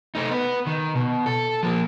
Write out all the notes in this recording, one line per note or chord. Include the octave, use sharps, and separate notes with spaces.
A3 D#4
B3 B4
D#3
B2
A4
F3 A#3